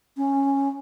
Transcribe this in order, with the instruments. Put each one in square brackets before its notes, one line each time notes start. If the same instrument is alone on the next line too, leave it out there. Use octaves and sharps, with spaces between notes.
[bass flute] C#4